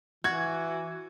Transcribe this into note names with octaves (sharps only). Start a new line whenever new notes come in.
E3 F#4 G#6